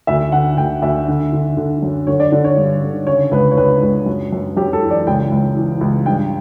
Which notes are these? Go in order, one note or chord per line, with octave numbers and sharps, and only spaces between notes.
D2 E5
D3 F#5
D2 G5
D2 E5
D3
D3
D3
F#2
D3 C#5
D5
D3 D5
C#5
G2
D3
C#3 C#5
C#2 B4
C#5
C#2 B4
C#2
F#2
F#2
F#2 G4
A4
E3
D5
C#2 G5
C#2
E3
C#2
G2 G5